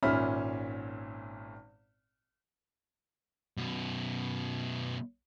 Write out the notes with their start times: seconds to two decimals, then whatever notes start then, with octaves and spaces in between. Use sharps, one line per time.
0.03 G#1 A#2 C#4 E5 B5 F6
3.57 F#2 B2